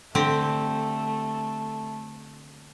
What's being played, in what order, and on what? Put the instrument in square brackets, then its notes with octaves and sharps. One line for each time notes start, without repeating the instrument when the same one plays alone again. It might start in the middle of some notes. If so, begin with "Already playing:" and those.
[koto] D3 C4 G4 [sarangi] A3